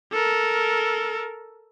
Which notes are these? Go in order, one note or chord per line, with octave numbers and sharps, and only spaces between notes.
A4 A#4